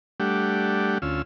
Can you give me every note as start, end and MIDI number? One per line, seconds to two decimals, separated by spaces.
0.20 0.98 55
0.20 0.98 57
0.20 0.98 62
0.20 0.98 67
0.20 0.98 78
1.02 1.22 38
1.02 1.22 61
1.02 1.22 65
1.02 1.22 88